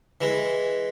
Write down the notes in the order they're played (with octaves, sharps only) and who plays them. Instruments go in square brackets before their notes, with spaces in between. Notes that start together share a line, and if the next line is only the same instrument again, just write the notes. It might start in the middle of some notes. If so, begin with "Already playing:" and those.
[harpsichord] E3 G#3